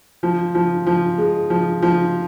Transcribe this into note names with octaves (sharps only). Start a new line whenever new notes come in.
F3
F3
F3
G#3
F3
F3